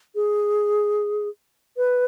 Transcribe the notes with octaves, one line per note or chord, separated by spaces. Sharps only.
G#4
B4